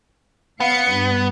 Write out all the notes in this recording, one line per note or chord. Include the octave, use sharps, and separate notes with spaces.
B3 F5 C#7
G2